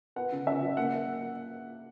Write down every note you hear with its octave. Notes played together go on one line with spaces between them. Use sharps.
B3 F#5
C#3
C#3 E5
F#3
A#3 F#5